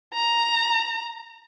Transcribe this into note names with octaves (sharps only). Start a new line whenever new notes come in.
A#5